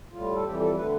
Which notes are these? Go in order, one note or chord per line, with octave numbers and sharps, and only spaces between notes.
A2 G3 F4
A4
F2 E3 G3 G4
A4
D3 A3 B4